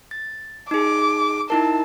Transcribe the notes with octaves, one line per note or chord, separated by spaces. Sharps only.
A6
D#4 G#4 D6
D#4 E4 A#4 A5